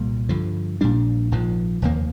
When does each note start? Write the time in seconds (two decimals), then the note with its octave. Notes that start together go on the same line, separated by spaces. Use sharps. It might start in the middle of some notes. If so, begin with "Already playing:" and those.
Already playing: C2 A#2 G3 A#3
0.29 G2 D3 F3
0.81 A#1 A#2 G3 D4
1.32 A#1 G#2 F3
1.82 F1 D#2 D#3 A#3